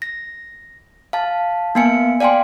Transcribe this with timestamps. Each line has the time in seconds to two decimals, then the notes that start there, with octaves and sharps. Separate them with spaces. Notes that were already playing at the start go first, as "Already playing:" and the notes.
0.02 A#6
1.13 F5 A5
1.75 A#3 B3 F5 G#5 C#7
2.20 D5 F5 G5 G#5 C6